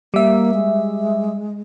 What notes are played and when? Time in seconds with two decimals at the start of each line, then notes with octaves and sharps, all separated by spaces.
0.14 G3 A#3 E5
0.54 G#3